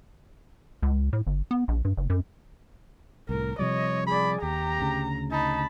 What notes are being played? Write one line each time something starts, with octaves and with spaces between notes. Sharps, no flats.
C#2
A2
G1
B3
A#1
G2
F#1
F#2
C2 A2 A#4
C3 F3 G3 C#5 D#5
G#4 D5 B5
D#2 G4 A#5
D2 C#3
D#4 A5 B5